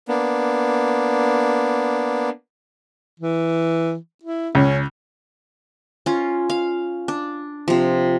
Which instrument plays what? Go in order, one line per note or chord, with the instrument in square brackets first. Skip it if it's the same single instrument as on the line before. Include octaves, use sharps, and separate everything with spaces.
[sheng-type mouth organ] A#3 B3 D4
[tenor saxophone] E3
E4
[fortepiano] C#2 [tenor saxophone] C#4
[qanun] C#4 F4
F5
D4
C3 F3